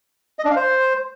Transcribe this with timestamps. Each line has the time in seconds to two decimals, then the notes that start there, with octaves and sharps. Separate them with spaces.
0.39 D#5
0.45 D4
0.50 F5
0.56 C5